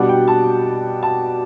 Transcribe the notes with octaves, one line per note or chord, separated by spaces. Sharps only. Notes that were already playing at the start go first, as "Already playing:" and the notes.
Already playing: B2 G3 D4 F#5
G5
A5
A5